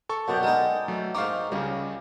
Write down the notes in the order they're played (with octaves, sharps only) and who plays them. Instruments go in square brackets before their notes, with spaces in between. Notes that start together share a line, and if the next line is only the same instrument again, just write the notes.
[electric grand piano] A4 C#6
[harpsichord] F#2 B2 [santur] B3 D5 G5
[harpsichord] G#3 D#4 [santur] A#4
[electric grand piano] F#3 A3
[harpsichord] G#2 D#4 [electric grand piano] F5 C#6 D6
[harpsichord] C#2 [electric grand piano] C#3 G3